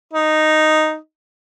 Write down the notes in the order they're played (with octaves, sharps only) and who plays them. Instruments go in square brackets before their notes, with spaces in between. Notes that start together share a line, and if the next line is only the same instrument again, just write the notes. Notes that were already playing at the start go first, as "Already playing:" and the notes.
[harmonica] D#4